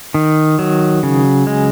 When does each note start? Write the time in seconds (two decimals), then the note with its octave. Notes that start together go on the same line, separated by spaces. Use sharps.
0.14 D#3
0.59 F#3
1.03 C#3
1.47 G#3